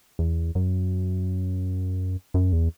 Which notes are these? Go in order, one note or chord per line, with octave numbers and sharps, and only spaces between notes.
E2
F#2
F#2
E2